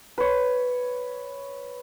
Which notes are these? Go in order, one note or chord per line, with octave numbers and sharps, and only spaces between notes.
B4 C#5